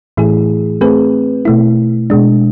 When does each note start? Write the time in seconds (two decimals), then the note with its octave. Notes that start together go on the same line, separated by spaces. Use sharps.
0.17 A2 E3 A3 E4 G#4
0.81 A3 C4 G#4 B4
1.45 B2 A3 E4
2.10 B2 G#3 D4